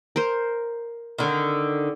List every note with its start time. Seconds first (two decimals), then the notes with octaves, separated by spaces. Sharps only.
0.16 A#4 C5
1.18 D3 D#3